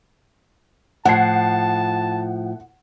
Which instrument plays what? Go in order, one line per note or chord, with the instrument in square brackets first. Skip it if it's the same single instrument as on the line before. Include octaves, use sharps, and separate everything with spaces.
[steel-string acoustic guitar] A2 F3 [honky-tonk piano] F#5 C7 [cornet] A5